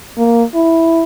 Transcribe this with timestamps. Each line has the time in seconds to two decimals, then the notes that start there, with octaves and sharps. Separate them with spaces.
0.17 A#3
0.55 E4